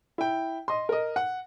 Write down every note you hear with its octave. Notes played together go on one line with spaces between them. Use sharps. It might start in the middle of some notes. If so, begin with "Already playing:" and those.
E4 G5
D#5 C6
A#4 D#5
F#5